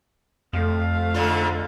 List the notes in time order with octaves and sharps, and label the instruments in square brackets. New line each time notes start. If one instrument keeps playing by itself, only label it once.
[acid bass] F2 [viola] A3 F5
[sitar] G#2 D3 F4